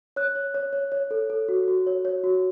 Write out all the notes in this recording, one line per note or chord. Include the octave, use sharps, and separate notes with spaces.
C#5 F#6
C#5
C#5
C#5
C#5
A4
A4
F#4
F#4
C#5
C#5
F#4